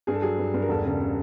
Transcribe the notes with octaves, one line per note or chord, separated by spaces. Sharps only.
G2 G#4
A4
F#3 G#4
G2
G2
A#4
E1 A4
C#3
C#3